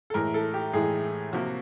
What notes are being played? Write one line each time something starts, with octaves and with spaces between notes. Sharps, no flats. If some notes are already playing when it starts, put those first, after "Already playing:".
A4
A2 E3 G#3 A#4
A4
G4
A2 E3 G#3 G#4
C3 F3 A#3 F#4